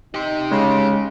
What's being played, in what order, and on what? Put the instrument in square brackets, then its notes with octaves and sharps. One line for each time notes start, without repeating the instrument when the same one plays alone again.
[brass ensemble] D#4 [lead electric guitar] G4 C6
[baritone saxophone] C#3 [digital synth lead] G#3